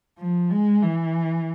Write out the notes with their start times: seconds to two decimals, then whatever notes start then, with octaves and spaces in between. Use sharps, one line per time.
0.18 F3
0.50 G#3
0.82 E3